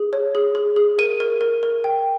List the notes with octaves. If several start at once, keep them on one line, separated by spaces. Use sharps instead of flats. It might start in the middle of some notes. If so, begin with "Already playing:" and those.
Already playing: G#4
C#5
G#4
G#4
G#4
A#4 D#7
A#4
A#4
A#4
G5